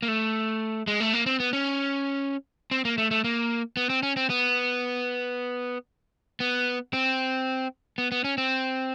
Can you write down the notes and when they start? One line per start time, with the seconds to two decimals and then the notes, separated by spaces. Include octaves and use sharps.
0.02 A#3
0.08 A3
0.87 G#3
1.00 A3
1.13 A#3
1.26 C4
1.40 B3
1.53 C#4
2.71 C4
2.85 A#3
2.98 A3
3.11 A3
3.24 A#3
3.77 B3
3.90 C4
4.03 C#4
4.17 C4
4.30 B3
6.40 B3
6.93 C4
7.98 B3
8.12 B3
8.24 C#4
8.38 C4